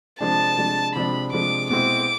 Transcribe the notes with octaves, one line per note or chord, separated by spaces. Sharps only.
C3 F3 G#3 D4 A5
C3 F3 G#3 D4
C3 F3 G#3 D4 B5
C3 F3 G#3 D4 D6
B2 G#3 C4 E4 D6